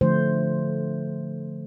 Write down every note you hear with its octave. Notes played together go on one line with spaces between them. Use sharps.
D3 F3 A3 C5